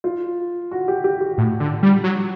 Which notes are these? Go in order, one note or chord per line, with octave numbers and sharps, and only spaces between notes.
F4
F#4
G4
G4
G4
A2
D3
G3
F#3